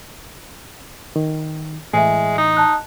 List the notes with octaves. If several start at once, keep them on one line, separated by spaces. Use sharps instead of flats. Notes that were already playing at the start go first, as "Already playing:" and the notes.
D#3
A2 E3 G#3 E5 G#5
D#4
D#5 A5 F#6